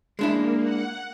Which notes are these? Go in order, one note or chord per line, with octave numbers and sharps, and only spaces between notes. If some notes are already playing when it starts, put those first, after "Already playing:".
G#3 A#3 D4 E4
F#5